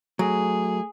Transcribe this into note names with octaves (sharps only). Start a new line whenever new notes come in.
F#3 A3 G#4